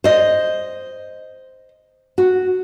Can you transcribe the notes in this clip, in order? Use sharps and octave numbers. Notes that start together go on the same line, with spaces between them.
C5 D#5
F#4